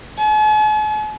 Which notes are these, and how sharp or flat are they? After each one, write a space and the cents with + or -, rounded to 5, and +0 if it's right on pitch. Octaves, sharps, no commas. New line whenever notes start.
G#5 +45